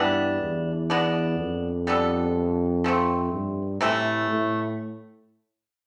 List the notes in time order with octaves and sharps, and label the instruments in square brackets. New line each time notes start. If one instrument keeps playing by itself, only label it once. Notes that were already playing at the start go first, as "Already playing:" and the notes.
Already playing: [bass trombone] G2 [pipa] E3 G3 B3 D4
[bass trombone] E2
[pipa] B2 B3 D4
[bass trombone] F2
[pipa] G3 B3 D4 A4
F3 A3 C4
[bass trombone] G2
[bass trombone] A2 [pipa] C3 E3 A3
[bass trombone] A2